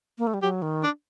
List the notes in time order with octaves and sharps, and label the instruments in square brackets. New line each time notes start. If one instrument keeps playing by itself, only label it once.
[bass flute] A#3
A3
G3
[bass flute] F#3 [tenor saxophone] G4
[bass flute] D#3
[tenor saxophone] D4